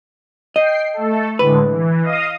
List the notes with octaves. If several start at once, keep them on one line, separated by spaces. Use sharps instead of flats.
D#5 G5 C7
A3 A4
A2 D3 G#3 B4
E3
D#5 F5 D#6